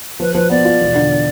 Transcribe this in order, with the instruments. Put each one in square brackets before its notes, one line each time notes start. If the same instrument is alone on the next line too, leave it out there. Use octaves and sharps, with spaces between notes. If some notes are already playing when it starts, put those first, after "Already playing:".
[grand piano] F3 [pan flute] B4
[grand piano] F3 [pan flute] B4
[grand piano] B3 [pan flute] D5
[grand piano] F4
E1
D3